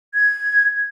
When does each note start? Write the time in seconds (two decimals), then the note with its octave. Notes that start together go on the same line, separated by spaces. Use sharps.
0.14 G#6